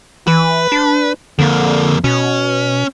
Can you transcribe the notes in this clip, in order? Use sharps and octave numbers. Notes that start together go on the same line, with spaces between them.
E3 B4
D4
F2 D3 A#3
B2 C#4